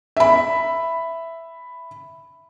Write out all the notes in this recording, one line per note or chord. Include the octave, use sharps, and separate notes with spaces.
E5 B5